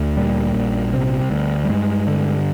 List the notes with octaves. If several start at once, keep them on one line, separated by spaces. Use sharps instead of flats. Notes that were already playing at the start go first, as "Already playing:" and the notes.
Already playing: D2
A#2 G3
A#1
C3
D2
G3
G2 G#3
D3